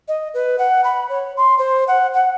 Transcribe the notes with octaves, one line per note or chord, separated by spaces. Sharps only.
D#5
B4
F#5
B5
C#5
C6
C5
F#5
F#5